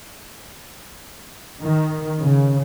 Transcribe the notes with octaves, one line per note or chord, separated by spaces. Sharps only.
D#3
C#3